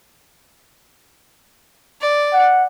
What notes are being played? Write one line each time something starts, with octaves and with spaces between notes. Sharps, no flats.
D5
F#5